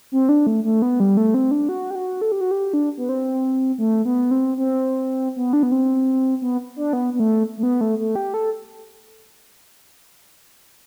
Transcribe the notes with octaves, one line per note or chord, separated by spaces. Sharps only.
C4
D4
A3
A3
B3
G3
A3
C4
D4
F#4
G4
F#4
A4
G4
F#4
G4
D4
B3
C4
A3
B3
C4
C4
B3
D4
B3
C4
B3
D4
B3
B3
A3
A3
B3
A3
A3
G4
A4